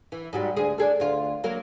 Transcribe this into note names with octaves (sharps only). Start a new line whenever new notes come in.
E3
G#2 F#3 G3
D2 G#4
D4 G#4 A4
D2 F4
F#3 A#3 A#4